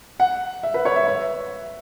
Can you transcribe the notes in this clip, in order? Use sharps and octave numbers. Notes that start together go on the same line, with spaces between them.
F#5
E5
B4
C#5
E5
E5